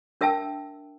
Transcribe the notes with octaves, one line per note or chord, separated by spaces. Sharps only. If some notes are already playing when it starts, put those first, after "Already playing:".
D4 A#4 E5 G5 A5 E6